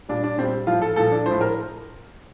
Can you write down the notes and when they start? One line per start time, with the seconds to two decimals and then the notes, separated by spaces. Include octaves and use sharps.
0.09 A#2 G3 D4
0.24 D4
0.38 A#2 G3 C4
0.67 A2 F3 F4
0.82 A4
0.96 A#2 F3 A4
1.12 D4
1.26 A2 F3 C5
1.41 A#4